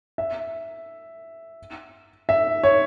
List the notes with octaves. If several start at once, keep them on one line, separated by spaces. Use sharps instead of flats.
E5
E5
C#5